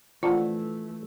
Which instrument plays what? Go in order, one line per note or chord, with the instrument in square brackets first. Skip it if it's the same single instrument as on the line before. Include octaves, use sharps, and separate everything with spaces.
[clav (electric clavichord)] F2 D3 A#4 [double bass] E3 A3 [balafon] F4